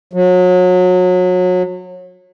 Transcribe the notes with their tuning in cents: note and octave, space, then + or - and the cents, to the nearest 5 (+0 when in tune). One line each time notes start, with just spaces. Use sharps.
F#3 -30